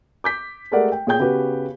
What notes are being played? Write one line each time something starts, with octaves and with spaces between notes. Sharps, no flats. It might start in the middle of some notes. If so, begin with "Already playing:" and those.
D6 G6 B6
G#3 A3 G4 A#4 D5 F#5
G5
A#2 G#4 C#5 G5 G6
C#3 B3 F#4 G4 B4